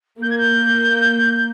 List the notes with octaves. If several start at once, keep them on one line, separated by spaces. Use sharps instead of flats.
A#3 G6
G#6
G6